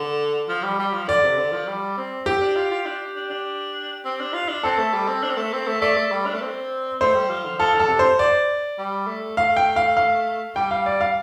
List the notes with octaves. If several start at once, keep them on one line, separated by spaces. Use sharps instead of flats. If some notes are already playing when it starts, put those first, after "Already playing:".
Already playing: D3
F3
G3
G3
F3
D3 D5
C3
D3
F3
G3
C4
G4
D4
F4
F4
D4
D4
D4
C4
D4
F4
D4
C4 A4
A3
G3
C4
D4
C4
A3
C4
A3
A3 D5
A3
G3
D4
A3
C4
A3 C5
G3
F3
D3
F3 A4
D3 A4
C3
C5
D5
G3
A3
A3 F5
G5
F5
F5
G3 G5
F5
D5
F5